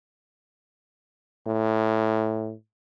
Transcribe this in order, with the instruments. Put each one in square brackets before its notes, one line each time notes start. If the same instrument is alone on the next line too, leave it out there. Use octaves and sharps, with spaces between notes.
[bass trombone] A2